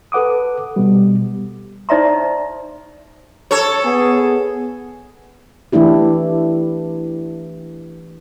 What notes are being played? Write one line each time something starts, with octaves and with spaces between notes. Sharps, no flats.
A4 B4 F#5 D6 D#6
B2 G3
D#4 C5 D5 E5 A#5 C6
A4 C#5
B3 G#4
E3 A3 D4 E4 G4